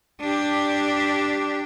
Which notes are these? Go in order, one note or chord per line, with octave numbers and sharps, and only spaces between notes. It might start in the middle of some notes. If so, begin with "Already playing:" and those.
D4 G4